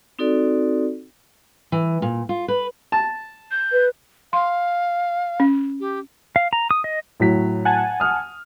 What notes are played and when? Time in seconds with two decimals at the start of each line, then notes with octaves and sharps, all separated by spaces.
0.19 C4 D#4 F#4 A4 D5
1.72 E3
2.02 A#2
2.29 F4
2.48 B4
2.92 A5
3.51 G6
3.72 B4
4.33 F5 C6
5.40 C#4
5.80 G4
6.36 F5
6.53 A#5
6.71 D#6
6.84 D#5
7.20 A2 F#3 B6
7.65 F#5 G#5 A5
8.00 D#6 F6